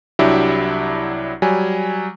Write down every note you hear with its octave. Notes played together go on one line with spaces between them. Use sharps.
C2 F#3 D4 E4 G4 E5
F#3 G3 G#5